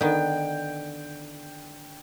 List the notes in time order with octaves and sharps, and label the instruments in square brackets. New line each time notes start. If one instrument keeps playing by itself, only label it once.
[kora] D3 [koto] D#3 B3 [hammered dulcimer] G5